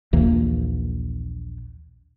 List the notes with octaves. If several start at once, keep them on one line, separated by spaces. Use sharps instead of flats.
A#1 D#2 E3 A#3